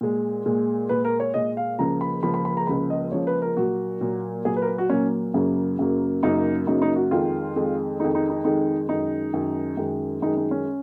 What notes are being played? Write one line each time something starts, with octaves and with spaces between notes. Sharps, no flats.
A#2 G#3
A#2 G#3
A#2 G#3 B4
A#4
C#5
A#2 G#3 D#5
F5
C#2 C#3 F3 A#3 A#5
B5
C#2 C#3 F3 A#3 B5
B5
B5
A#5
C#2 C#3 F3 A#3 B5
D#5
C#2 C#3 F3 A#3 C#5
B4
A#4
A#2 F#3 A#3 F#4
A#2 F#3 A#3
A#2 F#3 A#3 G#4
B4
A#4
B4
F#4
A#2 F#3 A#3 C#4
F#2 C#3 F#3 A#3
F#2 C#3 F#3 A#3
F#2 C#3 F#3 A#3 D#4
F#2 C#3 F#3 A#3 D#4
D#4
F#4
F2 D#3 G#3 F4
F2 D#3 G#3
F2 D#3 G#3 D#4
D#4
D#4
F2 D#3 G#3 D#4
F#2 D#3 G#3 D#4
F#2 D#3 G#3
F#2 D#3 G#3
F#2 D#3 G#3 D#4
D#4
C#4